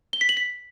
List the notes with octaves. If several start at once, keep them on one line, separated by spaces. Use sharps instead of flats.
G7
B6
F#7
B6